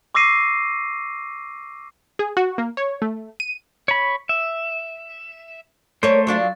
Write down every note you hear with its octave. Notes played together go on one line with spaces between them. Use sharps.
C#6 D6 E6 A#6 C7 D#7
G#4
F#4
A#3
C#5
A3
D#7
C#5 B5
E5
A3 A#3 A#4 C5 C#5
F#3 D4 F4